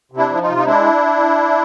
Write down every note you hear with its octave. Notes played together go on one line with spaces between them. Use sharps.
C3
D4 E4
F3
D#4 F4
C3
D#4
G#3 D4 E4